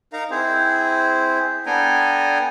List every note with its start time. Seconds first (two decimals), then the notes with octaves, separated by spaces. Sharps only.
0.13 D#4 A#4 F5 A#5
0.31 C4 E4 G#4 C5
1.66 B3 D4 A4 G5 G#5 A#5